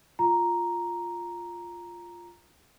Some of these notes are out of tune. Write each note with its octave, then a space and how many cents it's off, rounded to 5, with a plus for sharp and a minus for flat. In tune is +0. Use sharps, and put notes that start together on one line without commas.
F4 +0 A#5 +0